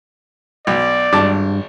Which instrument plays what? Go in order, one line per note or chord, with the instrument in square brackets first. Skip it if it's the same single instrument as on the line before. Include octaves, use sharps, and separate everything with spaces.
[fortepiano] B1 [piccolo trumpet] D5
[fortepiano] G#1 A5 D6 [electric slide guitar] G2